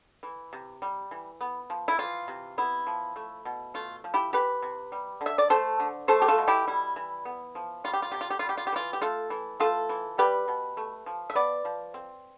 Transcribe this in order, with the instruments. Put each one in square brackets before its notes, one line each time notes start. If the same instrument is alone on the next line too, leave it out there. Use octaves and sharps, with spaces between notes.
[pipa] E3
C3
G3
E3
B3
F3
E4
E3 F4
C3
B3 E4
F3
A3
B2
A3 F4
F3
E4 G4
E3 G4 B4
C3
G3
D3
E5
D5
A3 A4 C5
D3
A3 A4 C5
G4
F4 A4
B2
E4 G4
G3 E4
E3
B3
F3
G3 F4
G4
F4
C3 G4
F4
G4
G3 F4
G4
F4
G4
E3 F4
G4
A3 F4 A4
E3
A3 F4 A4
E3
G3 G4 B4
B2
A3
F3
E5
B3 B4 D5
F3
C4